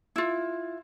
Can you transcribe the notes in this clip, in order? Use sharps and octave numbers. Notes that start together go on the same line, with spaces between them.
E4 F4